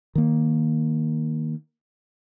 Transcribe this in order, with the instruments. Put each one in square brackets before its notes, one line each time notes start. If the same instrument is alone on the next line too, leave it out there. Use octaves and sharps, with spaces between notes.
[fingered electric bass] D#3 A#3